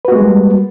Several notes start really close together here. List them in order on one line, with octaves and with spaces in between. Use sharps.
B4 F#4 A#3 G#3 G3